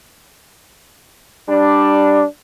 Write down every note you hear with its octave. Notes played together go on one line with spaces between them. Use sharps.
G3 D4